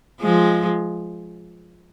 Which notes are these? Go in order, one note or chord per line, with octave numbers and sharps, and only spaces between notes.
F3 G#3